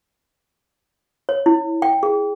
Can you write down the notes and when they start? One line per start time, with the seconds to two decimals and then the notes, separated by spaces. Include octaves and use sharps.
1.29 C#5
1.46 E4
1.82 G5
2.03 G#4